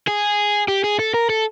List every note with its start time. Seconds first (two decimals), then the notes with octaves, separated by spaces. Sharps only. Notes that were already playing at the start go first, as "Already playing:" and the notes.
0.08 G#4
0.68 G4
0.84 G#4
0.99 A4
1.14 A#4
1.30 A4